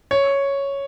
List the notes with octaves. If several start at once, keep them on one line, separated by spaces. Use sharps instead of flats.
C#5